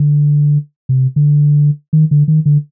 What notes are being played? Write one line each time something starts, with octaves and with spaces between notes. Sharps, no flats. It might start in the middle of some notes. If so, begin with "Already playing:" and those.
Already playing: D3
C3
D3
D#3
D3
D#3
D3